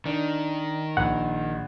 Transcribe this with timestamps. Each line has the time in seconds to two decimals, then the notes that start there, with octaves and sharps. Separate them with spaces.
0.06 D#3 D4
0.97 A#1 F#5